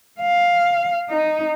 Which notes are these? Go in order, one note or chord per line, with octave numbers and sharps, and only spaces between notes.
F5
D#4